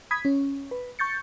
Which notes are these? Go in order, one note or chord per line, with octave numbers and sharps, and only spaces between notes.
B5 D#6 G#6 B6
C#4
B4
C#6 G6 A6 C#7